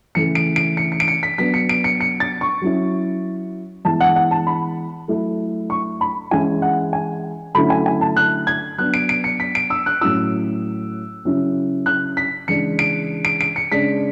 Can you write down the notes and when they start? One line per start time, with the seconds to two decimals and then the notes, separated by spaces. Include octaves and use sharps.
0.15 C#3 E3 A3 C#7
0.35 D7
0.56 D7
0.77 C#7
0.92 C#7
1.00 D7
1.08 C#7
1.23 B6
1.38 F#3 B3 D4 B6
1.54 C#7
1.69 D7
1.84 C#7
2.00 C#7
2.20 A6
2.41 C#6
2.62 F#3 C#4 E4
3.85 E3 G#3 B3 E4 A5
4.01 F#5
4.16 F#5
4.31 A5
4.47 B5
5.08 F#3 A3 E4
5.70 C#6
6.01 B5
6.31 E3 G#3 C#4 E4 G#5
6.62 F#5
6.93 G#5
7.55 D3 F#3 A3 C#4 E4 B5
7.70 G#5
7.86 G#5
8.01 A5
8.17 F#6
8.47 G#6
8.78 F#3 B3 D4 F#6
8.94 D7
9.09 D7
9.24 C#7
9.40 B6
9.55 D7
9.70 E6
9.86 F#6
10.01 A2 F#3 C#4 E4 E6
11.25 C#3 F#3 C#4 E4
11.86 F#6
12.17 B6
12.48 C#3 E3 G#3 D4 C#7
12.79 D7
13.25 D7
13.41 D7
13.56 C#7
13.72 C#3 G#3 D4 B6